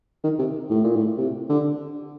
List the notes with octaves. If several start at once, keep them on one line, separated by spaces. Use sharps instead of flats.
D#3
C3
A2
A#2
A2
C3
D3